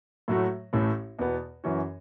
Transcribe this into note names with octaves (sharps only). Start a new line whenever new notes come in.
A2 F#3 A3 F#4
A1 A2 A3
E2 B2 B3
F#2 E3 C#4 F#4